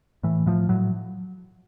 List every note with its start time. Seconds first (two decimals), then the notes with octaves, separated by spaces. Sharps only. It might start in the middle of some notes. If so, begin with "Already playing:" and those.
0.23 A2 E3
0.46 A2 F3
0.69 A2 F#3